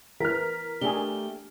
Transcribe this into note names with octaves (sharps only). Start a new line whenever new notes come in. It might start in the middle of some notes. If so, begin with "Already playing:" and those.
E3 A#4 F6 B6
A3 D4 G4 G#4 G7